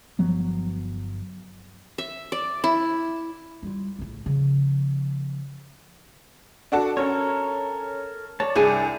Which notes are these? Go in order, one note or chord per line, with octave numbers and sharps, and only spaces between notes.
G1 F3 F#3 B3
E5
D5
E4
G3 F4
A#1 A2
C#3 F3
D4 F#4 A4
C#4 A4 A#4 C#5
C#5 D5 A5
C2 D4 G#4 G#5